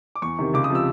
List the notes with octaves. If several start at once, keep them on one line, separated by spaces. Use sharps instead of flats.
D6
E2 C#6
C3 D#3
C#2 D6
D#6
C3 F3 E6